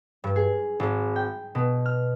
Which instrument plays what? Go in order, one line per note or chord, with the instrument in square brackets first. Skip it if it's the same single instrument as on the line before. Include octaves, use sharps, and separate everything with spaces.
[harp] G2
G#4
G#1
G5
B2
F6